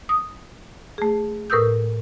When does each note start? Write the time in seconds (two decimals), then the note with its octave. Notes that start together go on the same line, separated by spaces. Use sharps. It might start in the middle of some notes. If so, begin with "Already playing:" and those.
0.09 D#6
0.98 A3 G#4
1.50 A2 A#4 B4 D#6 E6 G6